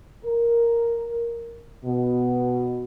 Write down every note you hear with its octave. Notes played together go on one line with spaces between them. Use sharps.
A#4
B2